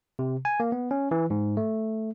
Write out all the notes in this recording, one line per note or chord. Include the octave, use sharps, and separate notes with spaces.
C3
G#5
A#3
B3
C#4
E3
G#2
A3